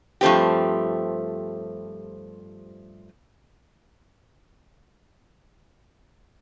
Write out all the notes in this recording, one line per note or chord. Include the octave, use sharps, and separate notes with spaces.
G2 F3 A3 C4 G4